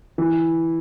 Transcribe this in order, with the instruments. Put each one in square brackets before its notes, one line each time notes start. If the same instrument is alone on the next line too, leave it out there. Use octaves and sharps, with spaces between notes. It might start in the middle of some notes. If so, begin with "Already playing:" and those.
[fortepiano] E3